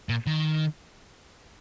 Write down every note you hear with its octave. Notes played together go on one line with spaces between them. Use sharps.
A#2
D#3